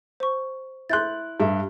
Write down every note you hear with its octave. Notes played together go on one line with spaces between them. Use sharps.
C5 C#6
E4 C6 F#6 G6 A6
G2 E5